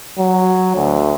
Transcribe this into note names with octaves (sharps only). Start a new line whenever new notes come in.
F#3
D2